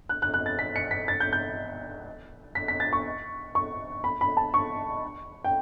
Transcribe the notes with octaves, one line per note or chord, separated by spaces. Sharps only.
F#6
F#6
F#6
A6
B6
C#7
B6
A6
G6
G6
B6
B6
A6
C#6
C#6
B5
B5
A5
C#6
G5